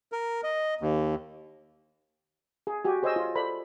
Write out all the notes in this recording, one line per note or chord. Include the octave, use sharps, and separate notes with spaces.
A#4
D#5
D#2
G#4
F#4 G4 G#5
G#4 C5 C#5 D#5 G#5 E6
F4
A4 C5 D5 B5